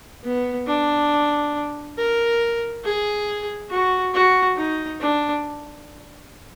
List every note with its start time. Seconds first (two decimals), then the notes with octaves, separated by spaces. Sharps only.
0.24 B3
0.67 D4
1.97 A#4
2.84 G#4
3.70 F#4
4.14 F#4
4.57 D#4
5.00 D4